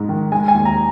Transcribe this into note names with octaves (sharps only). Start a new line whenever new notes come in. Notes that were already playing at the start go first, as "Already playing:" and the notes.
Already playing: G#2 G#3
D#3
G#3 G#5
G#5
D#2
A#5